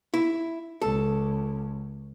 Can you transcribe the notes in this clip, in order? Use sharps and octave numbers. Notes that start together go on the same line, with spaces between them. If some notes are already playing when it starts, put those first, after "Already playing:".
E4
C#2 A4